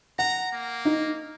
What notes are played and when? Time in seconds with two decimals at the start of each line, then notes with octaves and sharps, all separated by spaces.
0.19 F#5 A#5
0.52 A#3
0.85 D#4